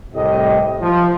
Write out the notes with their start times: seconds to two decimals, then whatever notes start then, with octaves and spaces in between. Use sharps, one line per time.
0.15 C2 A2 G4 D#5
0.81 F3